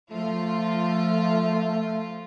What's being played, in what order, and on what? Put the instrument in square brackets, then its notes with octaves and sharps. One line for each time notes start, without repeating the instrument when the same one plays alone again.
[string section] F3 F4 [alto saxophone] A3